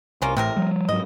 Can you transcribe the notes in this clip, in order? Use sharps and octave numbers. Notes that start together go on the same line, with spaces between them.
C2 A#3 C#4 F4
A1 A2 C3 C4 A#4
F3 G3
G#2 F#3 D#5